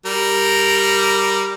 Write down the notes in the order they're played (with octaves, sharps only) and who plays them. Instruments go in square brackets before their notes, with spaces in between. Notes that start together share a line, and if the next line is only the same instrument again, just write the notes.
[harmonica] G3 A#4